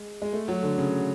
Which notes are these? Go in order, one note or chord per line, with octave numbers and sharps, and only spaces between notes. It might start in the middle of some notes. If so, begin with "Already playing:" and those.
Already playing: G#3
G#3
A3
F#3
D3
C#3